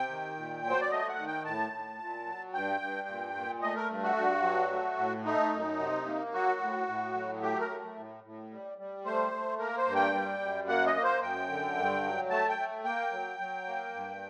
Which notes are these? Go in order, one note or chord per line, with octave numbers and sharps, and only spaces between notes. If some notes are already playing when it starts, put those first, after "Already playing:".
Already playing: C3 G5
D#3
A#2
F#3
C5
D5
A3 D#5
F#5
D#3
G5
A2 A5
A2
A#2
F#3
G2 G5
G2
A#2
A#2
A3 D#5
A#4
G2
F#4
G2
F#3
A3
A2
A3 D#4
F#2
C3
A#3
F#3 F#4
A2
A2
F#3
A3 G4
A#4
A3
A2
A2
G3
G3
A3 C5
A3
A#3 A#4
C5
G2
G5
G3
F#2
A#3 F#5
D#5
A#3
C5
F#2 G5
D3
G2
F#3
A3 A5
G5
A3
A#3 G5
F#3
F#3
A#3
G2